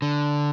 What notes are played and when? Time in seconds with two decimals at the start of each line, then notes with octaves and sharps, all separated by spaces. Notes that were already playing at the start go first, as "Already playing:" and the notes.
0.02 D3